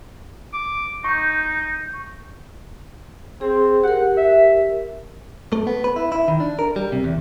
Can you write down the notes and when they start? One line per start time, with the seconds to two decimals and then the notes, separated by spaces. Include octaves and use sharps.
0.53 D6
1.04 D#4 C#6 G6
3.41 C4 G#4
3.84 G4 A#4 F#5
4.17 E5
5.53 A3
5.67 B3
5.84 B4
5.96 E4
6.12 E4
6.28 D#3
6.40 D4
6.59 A#4
6.76 G3
6.92 C3
7.04 E2